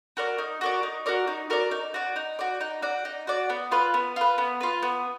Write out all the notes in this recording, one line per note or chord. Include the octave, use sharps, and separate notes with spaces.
F#4 A#4 D5
D#4
F#4 A#4 D5
D#4
F#4 A#4 D5
D#4
F#4 A#4 D5
D#4
F#4 D5
D#4
F#4 D5
D#4
F#4 D5
D#4
F#4 D5
B3
F4 B4
B3
F4 B4
B3
F4 B4
B3